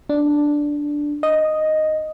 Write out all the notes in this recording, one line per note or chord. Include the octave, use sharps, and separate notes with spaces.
D4
D#5